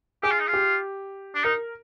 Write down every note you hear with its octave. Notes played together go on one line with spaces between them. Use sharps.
G4 G#4
F4
D#4
F4
G4
D4
D#4 A#4